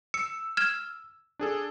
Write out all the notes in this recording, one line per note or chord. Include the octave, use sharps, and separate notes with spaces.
E6 C#7
F6 G#6 E7
D4 G#4 A4